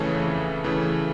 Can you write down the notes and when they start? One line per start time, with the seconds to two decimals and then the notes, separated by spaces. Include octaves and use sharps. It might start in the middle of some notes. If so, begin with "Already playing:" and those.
Already playing: F2 C#3 E3 A3 C#5
0.27 F2
0.64 C#3 E3 A3